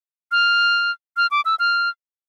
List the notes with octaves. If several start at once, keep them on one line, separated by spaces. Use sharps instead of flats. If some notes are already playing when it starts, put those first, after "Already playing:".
F6
F6
D6
E6
F6